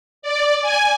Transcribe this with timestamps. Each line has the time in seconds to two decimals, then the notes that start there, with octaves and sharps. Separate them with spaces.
0.22 D5
0.62 G#5